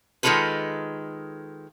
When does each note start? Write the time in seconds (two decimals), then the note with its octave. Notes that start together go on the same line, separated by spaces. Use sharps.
0.23 D#3 G#3 A3 F4 A4 B4